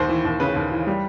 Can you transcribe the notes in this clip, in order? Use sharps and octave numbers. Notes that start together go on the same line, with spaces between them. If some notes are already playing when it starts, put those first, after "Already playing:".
Already playing: D#2 C5
E3
D#2
C#3 B4
D#2
E3
G3